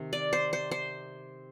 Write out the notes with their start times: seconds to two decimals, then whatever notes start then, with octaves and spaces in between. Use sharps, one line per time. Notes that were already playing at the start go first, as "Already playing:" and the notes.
Already playing: C3 D#3
0.13 D5
0.33 C5
0.53 C5
0.71 C5